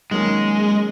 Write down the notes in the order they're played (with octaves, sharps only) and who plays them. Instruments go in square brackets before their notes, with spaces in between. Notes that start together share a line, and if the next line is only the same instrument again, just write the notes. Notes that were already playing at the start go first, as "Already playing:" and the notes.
[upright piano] D#3 F#3 A#3 C#4 [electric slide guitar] G#3